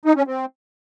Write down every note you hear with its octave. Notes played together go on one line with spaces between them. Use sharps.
D#4
C#4
C4